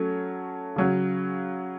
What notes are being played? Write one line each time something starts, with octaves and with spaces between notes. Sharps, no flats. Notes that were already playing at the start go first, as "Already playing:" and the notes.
Already playing: F#3 A3 C#4
C#3 F#3 C#4